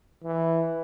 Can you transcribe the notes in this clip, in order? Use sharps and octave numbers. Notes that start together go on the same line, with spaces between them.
E3